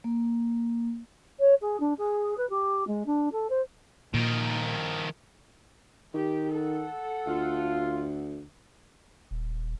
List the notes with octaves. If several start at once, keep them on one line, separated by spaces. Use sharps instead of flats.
A#3
C#5
G#4
D4
G#4
B4
G4
G#3
D4
A4
C5
A#2 D#3 F3
D#3 G4
A4 F#5
D2 F4
D#1